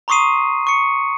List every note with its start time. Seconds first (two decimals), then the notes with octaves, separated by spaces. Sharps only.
0.08 A#5 C6 C#6 D#6 C7 D#7
0.67 C#6 C#7